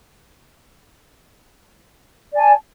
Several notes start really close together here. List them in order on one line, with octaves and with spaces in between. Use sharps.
D5 G#5 A5